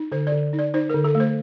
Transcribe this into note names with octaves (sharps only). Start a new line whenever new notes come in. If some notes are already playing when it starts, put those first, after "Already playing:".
Already playing: D#4
D3 C5
D5
D3
D#4
D5
D#4 C5
D3 A#4
A4
A3
C5